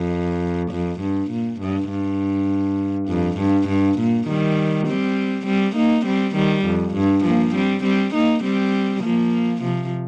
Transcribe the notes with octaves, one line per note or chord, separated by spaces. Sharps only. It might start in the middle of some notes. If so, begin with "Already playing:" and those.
Already playing: F2
F2
G2
A#2
G2
G2
F2
G2
G2
A#2
D#3 G3
G3 C4
G3 C4
A#3 D#4
G3 C4
D#3 G3
F2
G2
F3 A#3
G3 C4
G3 C4
A#3 D#4
G3 C4
F3 A#3
C3 F3